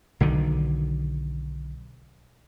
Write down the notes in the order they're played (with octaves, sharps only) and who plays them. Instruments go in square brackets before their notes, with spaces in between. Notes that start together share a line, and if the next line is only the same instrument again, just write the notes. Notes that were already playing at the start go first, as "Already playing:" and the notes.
[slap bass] B1 D3 D#3